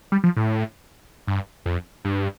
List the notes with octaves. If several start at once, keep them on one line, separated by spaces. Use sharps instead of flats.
G3
F3
A2
G2
F2
G2